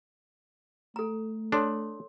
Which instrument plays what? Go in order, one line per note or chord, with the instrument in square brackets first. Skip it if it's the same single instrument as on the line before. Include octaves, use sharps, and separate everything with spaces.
[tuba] A3 [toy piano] A4 A#5
[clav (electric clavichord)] D4 [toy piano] A4 C#5 C6